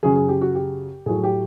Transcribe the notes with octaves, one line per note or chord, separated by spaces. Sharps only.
F#2 C#3 F#3 G#4
G#4
G4
F#4
G4
A2 F#3 A3 G#4
G4